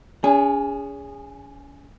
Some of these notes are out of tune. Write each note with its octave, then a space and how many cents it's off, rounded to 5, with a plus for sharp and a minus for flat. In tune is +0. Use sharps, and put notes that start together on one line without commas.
C#4 +35 G#4 -15